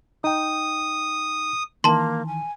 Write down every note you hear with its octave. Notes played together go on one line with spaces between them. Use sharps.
D#4 G5 D#6
D#3 E3 A#3 A5 C6
G#5